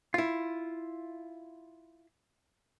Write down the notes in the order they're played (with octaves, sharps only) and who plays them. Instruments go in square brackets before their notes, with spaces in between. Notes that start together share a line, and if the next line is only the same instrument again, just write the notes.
[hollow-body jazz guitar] E4 F4